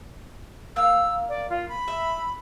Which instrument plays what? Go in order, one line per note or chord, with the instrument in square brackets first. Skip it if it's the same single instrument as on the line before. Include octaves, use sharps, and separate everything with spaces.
[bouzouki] A#3 F5 [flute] E6
[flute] D5
F4
B5
[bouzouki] E5